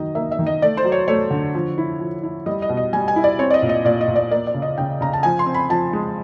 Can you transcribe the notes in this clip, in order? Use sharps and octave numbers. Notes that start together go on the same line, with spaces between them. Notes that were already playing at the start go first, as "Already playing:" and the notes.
Already playing: D#3 F#3 D#5
A#3 E5
E5
D#3
D#5
A3 D5
C5
F#3
C#5
A3 C#5
D3
F3
E4
F3
E4
G3 D#5
D#5
B2
D#5
G3 G#5
G#5
E4
D5
C4 C#5
D5
D#5
A#2
D#5
A#2 D5
D#5
A#2
D5
A#3 D5
D5
C#3
D#5
C#3 G5
C#3 A#5
A5
F3 G#5
C6
C4
B5
F3 A5
G#3